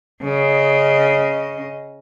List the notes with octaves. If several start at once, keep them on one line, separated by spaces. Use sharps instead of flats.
C#3 D#5